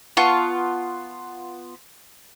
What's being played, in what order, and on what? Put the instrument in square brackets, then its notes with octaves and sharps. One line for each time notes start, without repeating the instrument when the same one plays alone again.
[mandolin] B3 F4 A5 C#6